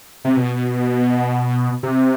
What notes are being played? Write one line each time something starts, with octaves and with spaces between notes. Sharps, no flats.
C3
B2
C3